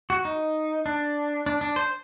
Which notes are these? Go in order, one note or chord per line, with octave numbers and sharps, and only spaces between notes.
F#4
D#4
D4
D4
D4
C5